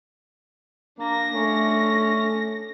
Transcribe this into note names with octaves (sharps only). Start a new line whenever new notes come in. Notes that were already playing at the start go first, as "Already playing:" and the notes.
A#3 D4 A#6
A3 C#4